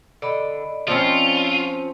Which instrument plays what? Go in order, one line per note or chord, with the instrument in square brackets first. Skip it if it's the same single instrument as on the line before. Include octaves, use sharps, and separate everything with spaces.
[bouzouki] D3 [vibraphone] D5 D#5 B5
[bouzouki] F3 C4 C#4 [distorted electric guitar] F4